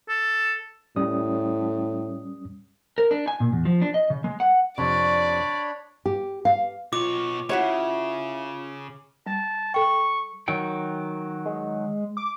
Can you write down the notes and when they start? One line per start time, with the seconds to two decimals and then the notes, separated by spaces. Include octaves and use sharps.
0.08 A4
0.96 A2 G3 C#4 D#6
2.98 A#4
3.11 D4
3.28 G#5
3.40 A#2
3.52 E2
3.65 F3
3.82 D4
3.94 D#5
4.10 C#3
4.24 G#3
4.40 F#5
4.78 F2 C3 D4 C#5 D5 B5 C#6
6.06 G4
6.45 F5
6.93 B2 F4 C#5 D6
7.49 C#3 E4 F#4 C#5
9.26 G3 A5
9.74 A4 G5 C#6
10.48 D#3 F#3 G5
11.46 G#3
12.17 D6